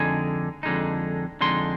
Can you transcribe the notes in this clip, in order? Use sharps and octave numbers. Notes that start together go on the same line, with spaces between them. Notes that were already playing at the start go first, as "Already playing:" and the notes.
Already playing: F2 D3 G#3 D#4 G#5
F2 D3 G#3 D#4
F2 D3 G#3 D#4 C6